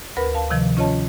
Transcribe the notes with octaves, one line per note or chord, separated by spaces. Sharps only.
D2 A#4 B4 B5
F5 A5
C3 D#3 F3
C#4 F4 C#5 D#5 A5